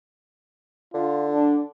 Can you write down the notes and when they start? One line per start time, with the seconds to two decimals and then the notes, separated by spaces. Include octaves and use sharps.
0.94 D3 F4
1.32 D4